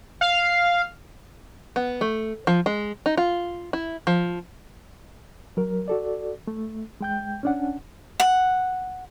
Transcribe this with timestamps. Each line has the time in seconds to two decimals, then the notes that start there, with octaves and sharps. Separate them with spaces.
0.21 F5
1.76 B3
2.01 A3
2.47 F3
2.66 G#3
3.06 D#4
3.17 F4
3.73 E4
4.07 F3
5.57 F#3 A#4
5.88 F#4 A4 D5
6.47 A3
7.01 G#3 G5 G6
7.43 C#4 D4 F#5
8.20 F#5